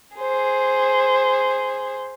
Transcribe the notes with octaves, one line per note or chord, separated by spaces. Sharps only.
G#4 C5